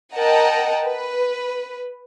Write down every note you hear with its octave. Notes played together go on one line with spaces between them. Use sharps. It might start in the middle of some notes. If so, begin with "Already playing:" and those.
A#4 D#5 F#5 G5 A5 A#5
B4